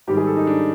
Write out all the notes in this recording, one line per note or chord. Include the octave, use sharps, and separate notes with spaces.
G#2 D#3 G3 G4
G#4
A4
D#4
D4